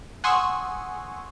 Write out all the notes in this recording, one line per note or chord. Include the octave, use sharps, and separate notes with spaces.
F#5 G#5 C6 C#6 D#6 E6